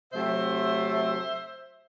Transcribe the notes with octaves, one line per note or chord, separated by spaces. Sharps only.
C3 F#3 A3 C4 C5 E5